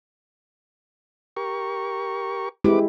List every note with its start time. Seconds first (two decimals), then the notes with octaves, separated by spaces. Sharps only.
1.37 G4 A#4 C#6
2.64 G#3 C4 E4 G4 B4 D6